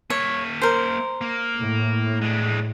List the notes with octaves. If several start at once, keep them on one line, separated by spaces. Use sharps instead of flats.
A#3 C#5 E5
A#4 C5
A#3
A2
G#3 D4